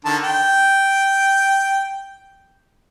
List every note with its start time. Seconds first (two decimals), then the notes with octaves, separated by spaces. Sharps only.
0.05 D3 D#3 A5
0.24 G5